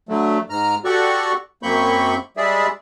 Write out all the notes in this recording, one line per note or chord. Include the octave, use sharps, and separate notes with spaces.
D3 F#3 A3
G#2 A#5 F6
F#4 G4 A4 D5 F#5 C#6
F#2 A#3 C4 B5 C#6 G6
G3 G#3 G#4 D5 E5